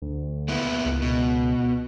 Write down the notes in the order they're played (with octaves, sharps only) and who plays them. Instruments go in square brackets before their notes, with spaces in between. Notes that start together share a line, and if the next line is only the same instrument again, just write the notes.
[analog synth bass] D2
[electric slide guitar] A#3 B3 E4
[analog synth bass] C#2
[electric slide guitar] B2